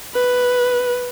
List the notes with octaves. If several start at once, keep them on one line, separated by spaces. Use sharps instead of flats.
B4